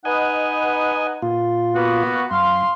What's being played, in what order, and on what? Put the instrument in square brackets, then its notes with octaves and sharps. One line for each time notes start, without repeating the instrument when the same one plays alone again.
[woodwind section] D#4 B4 F#5 [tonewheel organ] D#5 G#5
[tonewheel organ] A#2 F4
[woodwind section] A#3 B3 F#4
[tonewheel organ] F#2 [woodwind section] F5 C6